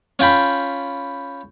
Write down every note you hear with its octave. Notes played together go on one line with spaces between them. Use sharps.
C#4 F4 G5 B5